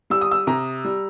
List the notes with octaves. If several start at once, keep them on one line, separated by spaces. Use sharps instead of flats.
G3 E6
D#6
E6
C3 A#5
G3